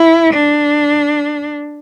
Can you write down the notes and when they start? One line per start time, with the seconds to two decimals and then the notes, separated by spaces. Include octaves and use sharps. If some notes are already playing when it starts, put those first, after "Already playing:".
Already playing: E4
0.34 D4